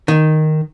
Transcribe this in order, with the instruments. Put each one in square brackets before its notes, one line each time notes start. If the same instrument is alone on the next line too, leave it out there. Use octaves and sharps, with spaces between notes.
[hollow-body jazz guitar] D#3